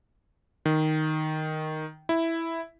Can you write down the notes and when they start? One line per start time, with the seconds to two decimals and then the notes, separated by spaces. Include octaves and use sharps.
0.66 D#3
2.09 E4